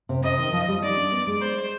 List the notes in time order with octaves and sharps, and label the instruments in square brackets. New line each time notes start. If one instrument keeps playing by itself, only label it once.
[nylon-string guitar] C3
[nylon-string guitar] C3 [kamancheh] D#5
[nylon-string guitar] D#3
F3
G3
[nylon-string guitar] D#4 [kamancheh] D5
[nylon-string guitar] D4
B3
G#3
[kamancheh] C5